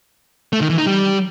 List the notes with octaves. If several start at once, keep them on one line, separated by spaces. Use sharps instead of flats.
A3
D#3
E3
D#4
G3